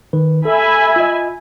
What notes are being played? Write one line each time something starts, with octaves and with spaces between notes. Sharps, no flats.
D#3 B4
A4 E5 G#5 B5
F4 D#5